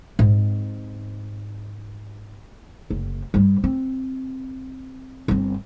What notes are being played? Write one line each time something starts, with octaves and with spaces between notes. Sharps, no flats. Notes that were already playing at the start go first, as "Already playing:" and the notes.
G#2 C4
F#1
G2 G3
C4
G1 C4